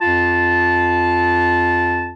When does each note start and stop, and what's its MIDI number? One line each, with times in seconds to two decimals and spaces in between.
0.01 2.13 41
0.01 2.13 65
0.01 2.13 81